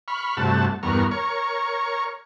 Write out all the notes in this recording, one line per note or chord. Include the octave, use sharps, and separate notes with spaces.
B5 C#6 F6
G2 C3 A3 F#4 A5
E2 G2 B3 A#4 C#6 F6
A#4 C#5 C#6